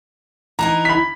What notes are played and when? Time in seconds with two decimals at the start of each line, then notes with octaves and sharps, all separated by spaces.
0.59 E3 D#4 E4 A#5
0.85 B5 B6